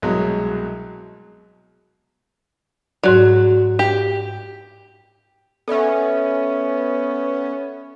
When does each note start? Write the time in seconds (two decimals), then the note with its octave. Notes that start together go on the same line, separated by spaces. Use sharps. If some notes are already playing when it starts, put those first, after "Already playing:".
0.02 C2 B2 F#3 G#3
3.04 G#2 F#3 F#4 D5
3.79 G4
5.68 B3 C#4 A4 D5 E5